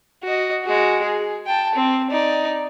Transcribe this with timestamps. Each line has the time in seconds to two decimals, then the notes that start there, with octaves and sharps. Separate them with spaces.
0.23 F#4 D#5
0.64 G#3 F#4
1.03 G#4
1.46 G5 A5
1.75 C4
2.10 D#4 D5